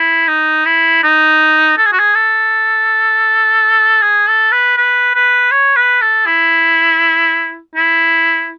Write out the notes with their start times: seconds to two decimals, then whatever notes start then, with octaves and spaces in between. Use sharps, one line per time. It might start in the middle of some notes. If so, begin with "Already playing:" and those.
Already playing: E4
0.28 D#4
0.66 E4
1.03 D#4
1.78 A4
1.85 G#4
1.92 F#4
1.99 G#4
2.14 A4
4.02 G#4
4.27 A4
4.52 B4
4.77 B4
5.15 B4
5.51 C#5
5.76 B4
6.01 A4
6.26 E4
7.75 E4